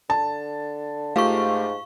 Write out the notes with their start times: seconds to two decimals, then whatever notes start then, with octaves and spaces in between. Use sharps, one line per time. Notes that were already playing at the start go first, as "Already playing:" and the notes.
0.10 D3 A5
1.16 G#2 A3 F4 G4 F5 C#6